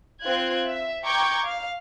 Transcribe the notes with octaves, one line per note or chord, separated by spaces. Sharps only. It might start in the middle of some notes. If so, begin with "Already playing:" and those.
C4 F4 F#6 G#6
E5
G5 A#5 C#6 D6 G6 G#6
F5